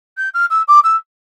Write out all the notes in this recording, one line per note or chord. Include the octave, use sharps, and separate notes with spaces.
G6
F6
E6
D6
E6